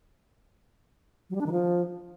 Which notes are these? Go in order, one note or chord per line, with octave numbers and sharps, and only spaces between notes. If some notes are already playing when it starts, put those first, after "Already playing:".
F#3
G3
D4
D#3
F3